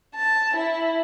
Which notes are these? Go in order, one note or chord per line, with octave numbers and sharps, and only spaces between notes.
A5
E4